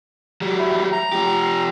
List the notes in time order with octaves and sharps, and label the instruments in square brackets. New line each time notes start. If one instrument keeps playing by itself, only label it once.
[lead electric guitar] F#3 G3
[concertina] E4
A#5
[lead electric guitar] F3 G4